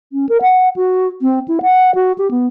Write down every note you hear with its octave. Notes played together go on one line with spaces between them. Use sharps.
C#4
A#4
F#5
F#4
C4
E4
F#5
F#4
G4
B3